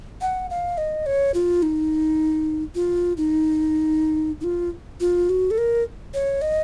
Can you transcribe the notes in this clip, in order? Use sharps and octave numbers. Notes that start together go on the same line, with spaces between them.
F#5
F5
D#5
C#5
F4
D#4
F4
D#4
D#4
F4
F4
F#4
A4
A#4
C#5
D#5